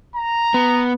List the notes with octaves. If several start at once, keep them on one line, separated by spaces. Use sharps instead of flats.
A#5
B3